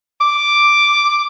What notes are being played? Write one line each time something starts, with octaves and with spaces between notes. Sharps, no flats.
D6